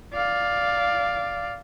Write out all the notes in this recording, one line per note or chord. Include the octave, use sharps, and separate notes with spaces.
D5 F5